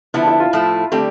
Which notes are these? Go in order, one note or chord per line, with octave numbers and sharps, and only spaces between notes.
D3 F3 B3 E4
E4
F4
A2 F3 A3 E4
D3 G3 A3 C4 G4